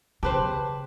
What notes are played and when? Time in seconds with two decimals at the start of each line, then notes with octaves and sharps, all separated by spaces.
0.23 C#3 G4 B4 C5 A5